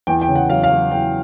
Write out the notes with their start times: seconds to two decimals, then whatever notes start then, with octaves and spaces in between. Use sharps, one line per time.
0.07 E2 G5
0.22 G5
0.28 C#3
0.36 F#5
0.49 F#3 F5
0.64 F5
0.71 F#3
0.91 E2 G5